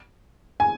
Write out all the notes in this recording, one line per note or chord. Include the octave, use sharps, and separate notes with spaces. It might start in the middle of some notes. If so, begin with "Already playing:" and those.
G#5